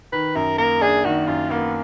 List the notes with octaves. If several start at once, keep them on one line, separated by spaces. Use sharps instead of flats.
D#3 B4
F#2 A#4
A#3 A#4
D4 G#4
D#3 F#4
F#2 F4
A#3 B3